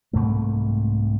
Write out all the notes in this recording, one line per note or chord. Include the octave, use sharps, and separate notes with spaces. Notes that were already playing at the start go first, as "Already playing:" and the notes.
C2 G#2 A3 A#3